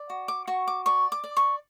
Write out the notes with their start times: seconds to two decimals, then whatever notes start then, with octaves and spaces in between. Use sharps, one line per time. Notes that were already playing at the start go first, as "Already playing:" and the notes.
Already playing: D5
0.10 F#4
0.28 D6
0.47 F#4 C#6
0.67 D6
0.86 D5 C#6
1.12 D6
1.24 D5
1.37 C#6